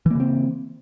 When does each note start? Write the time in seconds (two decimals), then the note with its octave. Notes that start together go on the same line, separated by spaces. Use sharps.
0.06 E3
0.11 A#3
0.15 C#3
0.20 C4